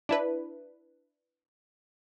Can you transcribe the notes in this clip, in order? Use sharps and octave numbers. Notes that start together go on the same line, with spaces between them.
D4 E4 B4